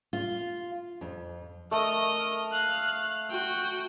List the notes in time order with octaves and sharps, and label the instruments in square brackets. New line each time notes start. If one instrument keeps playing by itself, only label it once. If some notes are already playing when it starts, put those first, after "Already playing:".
[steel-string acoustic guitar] F4
F2
[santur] A3 [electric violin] A#4 D#5
[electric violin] F5 F#6
F#4 G5